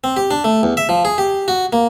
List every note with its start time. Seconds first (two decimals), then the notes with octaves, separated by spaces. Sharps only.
0.04 C4
0.17 G4
0.31 D4
0.44 A3
0.63 E2
0.77 E5
0.89 F3
1.05 G#4
1.18 G4
1.48 F#4
1.73 A#3